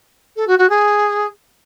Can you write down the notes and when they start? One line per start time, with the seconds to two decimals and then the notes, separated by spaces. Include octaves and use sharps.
0.36 A4
0.47 F#4
0.58 F#4
0.69 G#4